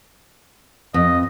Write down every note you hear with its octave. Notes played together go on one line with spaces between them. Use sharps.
F2 D#5